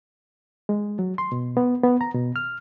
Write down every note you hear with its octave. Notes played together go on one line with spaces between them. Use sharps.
G#3
F#3
C6
B2
B3
B3
A#5
B2
F6